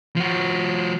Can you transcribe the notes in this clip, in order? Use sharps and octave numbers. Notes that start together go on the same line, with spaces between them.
F3 F#4